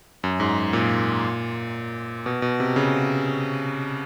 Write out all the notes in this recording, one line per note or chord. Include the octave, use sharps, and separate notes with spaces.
F#2
G#2
A#2
B2
B2
C3
C#3